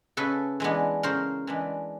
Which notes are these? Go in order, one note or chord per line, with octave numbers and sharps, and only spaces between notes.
C#3 A4 B4
E3 G#3 B3 D4
C#3 A#4 C5
E3 G#3 B3 D4